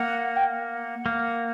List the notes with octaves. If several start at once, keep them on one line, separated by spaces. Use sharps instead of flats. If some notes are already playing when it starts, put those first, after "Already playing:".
Already playing: A#3 F#5
G5
F#5
A#3